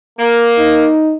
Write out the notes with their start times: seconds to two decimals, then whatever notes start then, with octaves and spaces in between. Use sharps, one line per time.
0.19 A#3
0.58 D#4